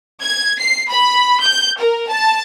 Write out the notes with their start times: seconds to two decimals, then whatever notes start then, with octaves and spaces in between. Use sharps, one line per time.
0.22 G#6
0.60 C7
0.91 B5
1.42 G6
1.78 A#4
2.10 A5